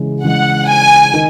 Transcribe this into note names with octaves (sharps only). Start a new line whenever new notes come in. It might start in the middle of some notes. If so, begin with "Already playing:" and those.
Already playing: C#3 E3 G#3
C#3 E3 G#3 F#5
G#5
D#3